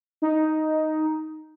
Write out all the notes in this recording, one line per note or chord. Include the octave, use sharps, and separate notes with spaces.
D#4